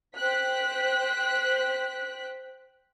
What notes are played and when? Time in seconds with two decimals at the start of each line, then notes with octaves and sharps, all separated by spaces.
0.16 C5 G5 F#6 B6